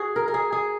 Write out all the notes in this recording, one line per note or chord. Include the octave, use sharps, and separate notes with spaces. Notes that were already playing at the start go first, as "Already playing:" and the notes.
Already playing: F#4 G#4
A#4
A#4
G#4
G#4